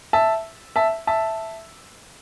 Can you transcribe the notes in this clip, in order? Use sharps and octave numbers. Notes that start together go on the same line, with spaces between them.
E5 A5
E5 A5
E5 A5